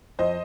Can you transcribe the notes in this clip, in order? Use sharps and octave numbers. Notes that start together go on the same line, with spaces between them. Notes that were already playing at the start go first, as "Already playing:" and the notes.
F2 C5 D#5